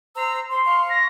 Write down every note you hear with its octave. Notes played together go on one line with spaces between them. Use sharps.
C5 A#5 E6
C5 C6
F5 C#6
A#6